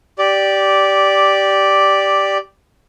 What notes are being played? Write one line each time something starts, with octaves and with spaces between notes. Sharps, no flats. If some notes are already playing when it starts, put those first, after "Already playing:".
G4 D5